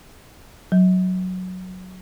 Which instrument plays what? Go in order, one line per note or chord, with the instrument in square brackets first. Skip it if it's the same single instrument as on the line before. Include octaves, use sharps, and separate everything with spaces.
[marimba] F#3